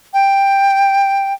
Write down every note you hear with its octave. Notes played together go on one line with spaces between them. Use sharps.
G5